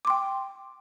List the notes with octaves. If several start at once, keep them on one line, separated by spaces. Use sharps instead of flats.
G5 C6 D6